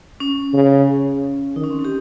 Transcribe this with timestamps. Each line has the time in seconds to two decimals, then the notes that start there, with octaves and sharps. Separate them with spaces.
0.20 C#4
0.54 C#3
1.56 D#3 D#4
1.64 C#4
1.71 C4
1.79 C#4
1.85 G4